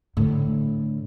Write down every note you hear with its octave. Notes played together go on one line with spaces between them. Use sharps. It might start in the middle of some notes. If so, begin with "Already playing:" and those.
A2 D3